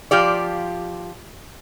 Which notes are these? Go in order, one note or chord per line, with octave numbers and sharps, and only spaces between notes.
F3 F4 G4 D5